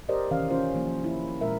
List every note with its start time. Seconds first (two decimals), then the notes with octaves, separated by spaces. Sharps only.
0.09 G4 A#4 C5 D5 D#5
0.31 C3 D#3 E3 C#4 F5
0.51 C#4 F4 C5
0.74 E3 F3 A#3
1.04 E4
1.41 A#2 G#3 A#4 E5